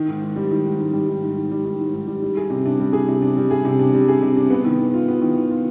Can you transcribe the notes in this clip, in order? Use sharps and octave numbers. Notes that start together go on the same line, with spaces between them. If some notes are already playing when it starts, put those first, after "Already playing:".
Already playing: D#3
G#2
G#2
G3
D#3
G#2
G#2
G3
D#3
G#2
G#2
G3
D#3
G#2
G#2
G3
G3
G#4
C3
D4
G3
G#4
C3
D4
G3
G#4
C3
D4
G3
G#4
C3
D4
B3
D#3
D#3
F4
B3
D#3
D#3
F4